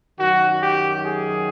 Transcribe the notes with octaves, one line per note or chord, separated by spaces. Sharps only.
F#2 D#3 F#3 F#4
G4
G#4